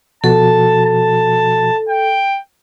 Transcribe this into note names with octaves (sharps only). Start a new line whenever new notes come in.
B2 F3 F#4 A4 A5
A5
G5